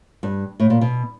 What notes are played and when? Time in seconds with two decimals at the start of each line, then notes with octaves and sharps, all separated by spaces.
0.23 G2
0.60 A2
0.70 A#2
0.81 B2